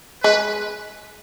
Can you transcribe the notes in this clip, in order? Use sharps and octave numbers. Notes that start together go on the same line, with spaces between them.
G#3 B4